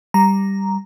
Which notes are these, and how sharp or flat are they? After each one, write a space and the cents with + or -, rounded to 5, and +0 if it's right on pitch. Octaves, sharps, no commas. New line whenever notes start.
G3 +0 A#5 +0